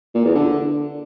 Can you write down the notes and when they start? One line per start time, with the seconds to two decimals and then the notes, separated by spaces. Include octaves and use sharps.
0.15 A#2
0.25 E2
0.35 D3